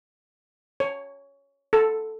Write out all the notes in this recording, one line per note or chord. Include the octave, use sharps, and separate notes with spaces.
C#5
A4